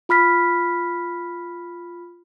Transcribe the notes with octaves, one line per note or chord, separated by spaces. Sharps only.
F4 B5 F6 B6